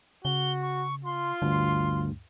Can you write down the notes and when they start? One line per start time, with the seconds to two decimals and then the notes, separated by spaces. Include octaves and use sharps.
0.25 C#3 F#4 G7
0.62 C#6
1.05 F4 C6
1.42 D2 G2 D3